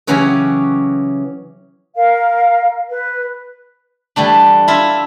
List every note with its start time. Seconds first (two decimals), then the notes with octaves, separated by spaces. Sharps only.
0.07 C#3 E3 F#3 C#4 F#4 G4
1.95 A#4 F5
2.88 B4
4.16 E3 G3 A3 D4
4.68 E4 F4 E5